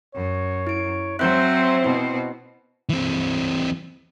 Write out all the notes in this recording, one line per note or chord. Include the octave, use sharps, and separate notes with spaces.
F#2 C#5
E4 D7
F#3 C4 C5 E5 F#6 G6
B2 E4
E3 C4